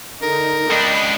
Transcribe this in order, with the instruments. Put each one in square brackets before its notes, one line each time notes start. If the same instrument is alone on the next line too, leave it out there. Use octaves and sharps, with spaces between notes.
[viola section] D3 D#4 [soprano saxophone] A#4
[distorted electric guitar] C#2 D4 [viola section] D#5 G5 B5